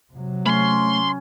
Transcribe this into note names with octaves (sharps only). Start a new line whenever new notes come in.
C3 F#3
A3 C#4 B5 C6